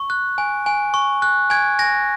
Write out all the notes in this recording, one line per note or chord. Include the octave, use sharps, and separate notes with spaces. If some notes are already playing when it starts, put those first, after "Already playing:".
Already playing: C#6
F#6
G#5
G#5
C#6
F#6
G#5 G#6
G#5 A#6